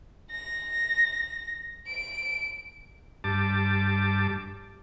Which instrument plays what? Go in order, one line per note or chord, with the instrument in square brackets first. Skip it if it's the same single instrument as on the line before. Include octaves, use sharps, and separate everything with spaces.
[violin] A#6
D7
[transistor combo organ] G2 A5 D6